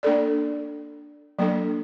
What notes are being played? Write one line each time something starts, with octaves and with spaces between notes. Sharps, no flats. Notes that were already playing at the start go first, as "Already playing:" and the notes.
A#3 D4 A4 D5
F#3 A#3 D4 A4